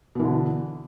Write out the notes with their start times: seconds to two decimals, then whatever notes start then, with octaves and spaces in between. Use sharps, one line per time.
0.15 B2
0.20 E3
0.24 D3